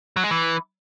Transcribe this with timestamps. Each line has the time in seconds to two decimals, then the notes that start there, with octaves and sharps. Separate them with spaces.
0.16 F#3
0.24 G#3
0.31 E3